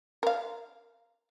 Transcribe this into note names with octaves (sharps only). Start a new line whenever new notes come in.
A#4 F5